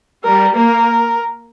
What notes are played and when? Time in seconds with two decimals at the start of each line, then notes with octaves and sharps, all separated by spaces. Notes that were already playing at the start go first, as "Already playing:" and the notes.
0.24 G3 A#4
0.54 A#3 A#4